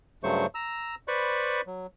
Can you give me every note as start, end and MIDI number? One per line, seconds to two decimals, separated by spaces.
0.23 0.46 43
0.23 0.46 49
0.23 0.46 54
0.23 0.46 57
0.23 0.46 72
0.23 0.46 85
0.55 0.95 82
0.55 0.95 88
1.08 1.61 71
1.08 1.61 72
1.08 1.61 74
1.08 1.61 83
1.08 1.61 85
1.67 1.87 54